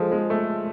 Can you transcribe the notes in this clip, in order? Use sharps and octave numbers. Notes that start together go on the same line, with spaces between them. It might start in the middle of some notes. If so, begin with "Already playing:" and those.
Already playing: F3 G#3 A4 C5
G#3
A3